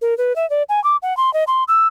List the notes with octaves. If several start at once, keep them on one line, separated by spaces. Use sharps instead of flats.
A#4
B4
E5
D5
G#5
D6
F#5
C6
D#5
C6
E6